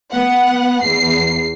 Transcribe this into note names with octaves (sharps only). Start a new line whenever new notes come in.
B3 F#5
E2 C7